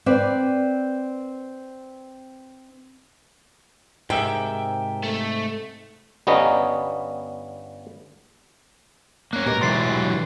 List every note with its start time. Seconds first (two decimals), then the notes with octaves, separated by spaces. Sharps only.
0.06 C4 B4 D5
4.10 G#2 C3 G4 G#4 A#4 E5 G5
5.04 A3
6.27 G1 G3 B3 C#4 D#5 A#5
9.33 A#3 C#4 F#6
9.46 B2 G#3 G4 A#4
9.61 D3 E3 F#3 C6 A6 C7